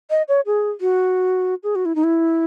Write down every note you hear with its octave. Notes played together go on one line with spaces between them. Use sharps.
D#5
C#5
G#4
F#4
G#4
F#4
E4
D#4
E4